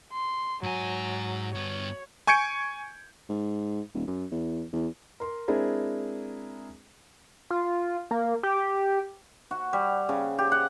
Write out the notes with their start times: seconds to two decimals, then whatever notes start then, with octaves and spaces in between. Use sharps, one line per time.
0.13 C6
0.63 G#2 F#3 G#5
1.55 G2 B3 C#5
2.27 G#5 C#6 G6 G#6 C#7 D7
3.29 G#2
3.94 D#1
4.07 F#2
4.31 E2
4.73 E2
5.20 A#4 C6
5.48 G#3 C4 D4 E4 G#4 A#4
7.50 F4
8.11 A#3
8.43 G4
9.51 F#4
9.73 G3
10.09 C#3
10.38 G4
10.52 F#5